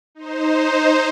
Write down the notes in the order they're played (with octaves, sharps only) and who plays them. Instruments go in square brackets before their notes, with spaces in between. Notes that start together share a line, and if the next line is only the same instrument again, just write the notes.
[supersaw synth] D#4 C5